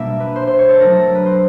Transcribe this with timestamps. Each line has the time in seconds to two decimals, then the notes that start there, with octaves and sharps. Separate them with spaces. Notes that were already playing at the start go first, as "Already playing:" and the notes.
Already playing: B2 G3 A#3 D4 E5
0.20 B4
0.36 C5
0.47 C5
0.59 C#5
0.69 A4
0.80 F#3 A3 D4 A#4
0.92 A4
1.04 A#4
1.15 B4
1.26 C5